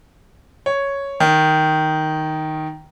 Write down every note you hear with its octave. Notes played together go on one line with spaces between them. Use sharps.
C#5
D#3